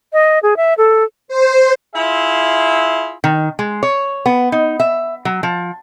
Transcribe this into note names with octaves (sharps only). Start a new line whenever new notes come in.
D#5
G#4
E5
A4
C5
E4 F4 G#4 E5
D#3
G#3
C#5
B3
D#4
E5
F#3
F3